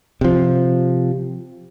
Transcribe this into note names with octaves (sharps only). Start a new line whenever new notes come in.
C3 F3